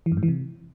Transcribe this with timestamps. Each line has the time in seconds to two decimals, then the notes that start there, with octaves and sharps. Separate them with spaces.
0.06 E3
0.12 F#2
0.17 G#2
0.23 E3
0.28 C3